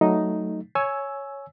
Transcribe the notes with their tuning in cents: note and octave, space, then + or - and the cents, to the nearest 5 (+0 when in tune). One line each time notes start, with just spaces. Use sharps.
F#3 +5 A3 +0 D#4 +0
C#5 +0 G#5 +15 E6 +0